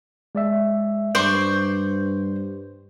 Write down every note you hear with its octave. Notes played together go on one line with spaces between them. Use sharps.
G#3 D5 E5
G2 C5 D5 C#6 G6